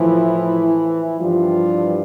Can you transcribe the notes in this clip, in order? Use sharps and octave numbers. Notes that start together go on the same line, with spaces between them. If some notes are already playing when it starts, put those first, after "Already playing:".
Already playing: A2 E3 F3 E4
G2 E3 F3 G3 F4